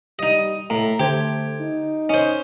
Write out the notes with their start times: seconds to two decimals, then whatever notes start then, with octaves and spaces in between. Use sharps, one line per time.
0.19 G3 D#4 D#5
0.70 A2 A3 A#5
1.00 D3 A3 G4 C5 G#6
1.61 D#4
2.09 C#4 C5 D#5